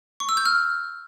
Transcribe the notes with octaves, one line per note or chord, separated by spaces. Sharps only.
C#6
E6
G6
F6